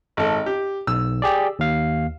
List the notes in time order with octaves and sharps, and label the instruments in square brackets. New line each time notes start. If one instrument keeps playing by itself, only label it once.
[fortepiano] G#1 A4
G4
[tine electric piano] B1 [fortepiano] E6
[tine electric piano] G4 G#4 D5
D#2 F5